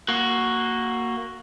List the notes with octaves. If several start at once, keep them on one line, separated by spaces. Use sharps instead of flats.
A#3 F#4